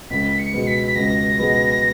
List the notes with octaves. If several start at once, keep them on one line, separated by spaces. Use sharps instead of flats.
C#2 B6
C#7
B2 G#3 B3
B6
B6
C#2 A#6
B2 G#3 B3